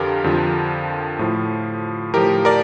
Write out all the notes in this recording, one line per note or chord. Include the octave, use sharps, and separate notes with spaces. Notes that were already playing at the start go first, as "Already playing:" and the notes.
Already playing: F2 D3 F3 F4 G4 A#4
F2 D3 F3
A2 F3
A2 F3 G4 A#4
A#4 D5